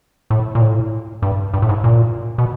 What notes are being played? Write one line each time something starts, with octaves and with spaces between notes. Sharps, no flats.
A2
A#2
A2
G2
G2
A2
G#2
A#2
B2